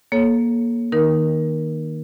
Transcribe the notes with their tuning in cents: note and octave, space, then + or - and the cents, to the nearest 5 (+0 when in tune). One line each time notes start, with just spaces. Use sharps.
A#3 +15 A4 -20 C#5 +0
D#3 +0 D#4 +0 A#4 +20